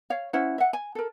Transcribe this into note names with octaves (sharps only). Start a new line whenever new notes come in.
C#5 F5
C#4 E4 C5 F#5
E5 F#5
G#5
A4 A#4